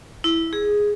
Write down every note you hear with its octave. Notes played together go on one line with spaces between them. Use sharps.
E4
G#4